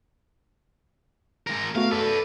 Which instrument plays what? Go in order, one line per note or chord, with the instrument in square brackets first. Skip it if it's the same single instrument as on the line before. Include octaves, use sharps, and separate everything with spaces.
[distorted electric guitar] G#3 A#4
[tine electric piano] A3 B3 F#4 [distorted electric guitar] F5
[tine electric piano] A4 [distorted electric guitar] B4 D5